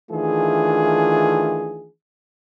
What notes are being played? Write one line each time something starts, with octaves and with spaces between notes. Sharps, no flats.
D#3 E3 A3 D4 F4 G#4